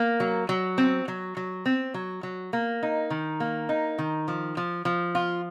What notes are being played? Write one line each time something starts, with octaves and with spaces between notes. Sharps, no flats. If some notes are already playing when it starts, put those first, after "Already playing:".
Already playing: A#3
F#3
F#3
C4
F#3
F#3
C4
F#3
F#3
A#3
D#4
D#3
A#3
D#4
D#3
F3
F3
F3
F4